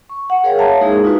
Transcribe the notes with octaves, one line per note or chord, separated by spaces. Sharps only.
C#6
F#5
G#4 A#4 C#5 F5 G5
C#5 E5 F5 G5 A5 A#5
G#3 A#3 D#4 E4 G#4 A#4
D#4 F4 F#4 B4